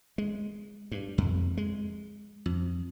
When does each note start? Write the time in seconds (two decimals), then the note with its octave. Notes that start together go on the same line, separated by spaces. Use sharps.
0.18 G#3
0.92 G2
1.18 F2
1.57 G#3
2.46 F2